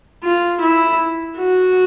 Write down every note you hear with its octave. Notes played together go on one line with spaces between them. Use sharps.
F4
E4
F#4